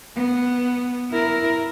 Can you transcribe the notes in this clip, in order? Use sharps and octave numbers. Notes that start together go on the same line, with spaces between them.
B3
E4 A#4